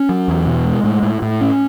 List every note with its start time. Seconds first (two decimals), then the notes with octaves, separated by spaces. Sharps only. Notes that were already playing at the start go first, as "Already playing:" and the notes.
Already playing: C#4
0.09 F#3
0.28 E2
0.46 B2
0.65 G#3
0.84 A2
1.03 A2
1.22 A2
1.41 C#4